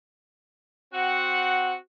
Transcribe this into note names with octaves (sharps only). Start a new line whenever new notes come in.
C4 F#4 F#5